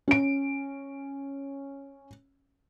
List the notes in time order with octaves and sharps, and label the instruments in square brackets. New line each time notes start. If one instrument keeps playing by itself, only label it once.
[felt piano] C#4 D7